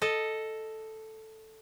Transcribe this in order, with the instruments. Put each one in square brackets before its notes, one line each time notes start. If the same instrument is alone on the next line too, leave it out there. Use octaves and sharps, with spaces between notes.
[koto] A4 D#5